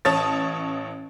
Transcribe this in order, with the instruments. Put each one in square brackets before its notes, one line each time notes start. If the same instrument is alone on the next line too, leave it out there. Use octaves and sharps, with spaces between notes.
[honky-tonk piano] A1 C#5 A5 D#6 A6